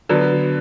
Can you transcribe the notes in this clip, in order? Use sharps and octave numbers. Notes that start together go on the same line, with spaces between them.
D3 F#3 B3